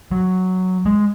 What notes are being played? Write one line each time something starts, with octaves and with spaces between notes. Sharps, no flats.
F#3
G#3